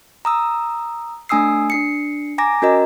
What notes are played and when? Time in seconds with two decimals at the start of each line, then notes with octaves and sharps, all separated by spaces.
0.25 A#5 D#6 E6
1.29 A3 D4 G#5 D#6 E6 C7
1.70 D4 C7 C#7
2.38 G#5 A#5 D6 A#6
2.62 C#4 F#4 A#4 D#5 A#5